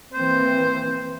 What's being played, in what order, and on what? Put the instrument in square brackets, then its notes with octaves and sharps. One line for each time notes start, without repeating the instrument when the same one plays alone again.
[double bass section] E3 A#3 C4 [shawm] C5